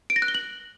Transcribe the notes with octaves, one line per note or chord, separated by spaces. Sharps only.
D7
A#6
F#6
G7
F#7